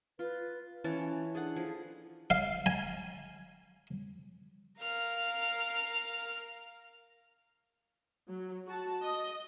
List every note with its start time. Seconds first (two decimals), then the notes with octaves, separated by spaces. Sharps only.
0.19 F4 B4
0.84 E3 C#4 C#5 A5
1.35 D4 G#4 A4 F#5
1.56 F3 G#4
2.30 F5
2.66 G#5
4.80 A#4 F5 F6
8.29 F#3
8.67 F#4 A5
9.03 D#5